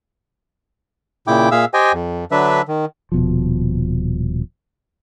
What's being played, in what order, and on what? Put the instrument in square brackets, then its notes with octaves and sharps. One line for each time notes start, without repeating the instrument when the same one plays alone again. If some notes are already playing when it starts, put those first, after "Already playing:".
[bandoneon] A#2 C#3 E4 G5 D6
A#2 G#4 E5 F5 E6
G4 C5 D#5 G5 G#5
F2
D3 F#3 D4 B4 E5
D#3
[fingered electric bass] D#1 B2 F3